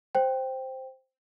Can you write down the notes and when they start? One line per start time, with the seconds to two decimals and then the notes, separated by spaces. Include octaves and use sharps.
0.15 C5 G5